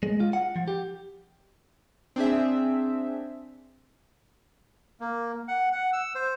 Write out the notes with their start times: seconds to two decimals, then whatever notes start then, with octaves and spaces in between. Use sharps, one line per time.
0.03 G#3
0.20 F4
0.33 F#5
0.56 F3
0.68 G4
2.16 C4 D4 G#4 E5
5.00 A#3
5.48 F#5
5.73 F#5
5.93 E6
6.15 C5